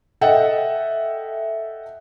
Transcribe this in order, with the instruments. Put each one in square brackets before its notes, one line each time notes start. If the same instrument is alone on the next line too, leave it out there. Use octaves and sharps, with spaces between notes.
[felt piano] A4 D#5 E5 F#5 G5